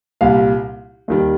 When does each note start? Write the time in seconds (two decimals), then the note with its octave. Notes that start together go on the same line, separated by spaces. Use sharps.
0.21 C2 A#2 G3 F5
1.08 D#2 D#3 G3